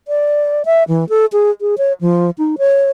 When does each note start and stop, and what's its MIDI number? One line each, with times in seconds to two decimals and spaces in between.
0.08 0.63 74
0.65 0.83 76
0.88 1.08 52
1.09 1.26 69
1.33 1.51 68
1.61 1.75 68
1.78 1.93 73
2.01 2.30 53
2.38 2.56 63
2.58 2.91 73